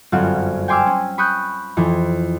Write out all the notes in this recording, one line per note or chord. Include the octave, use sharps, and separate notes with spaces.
G1 F#2 C4 F4 F#5
G5 G#5 C6 D6 E6 F6
C#4
B5 C#6 D#6 F#6 G6
F2 E3